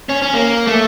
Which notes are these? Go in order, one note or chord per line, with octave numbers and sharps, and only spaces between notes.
C#4
C#4
A#3
A3